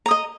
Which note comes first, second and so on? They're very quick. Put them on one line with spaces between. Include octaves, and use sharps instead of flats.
A#5 D#6 D#5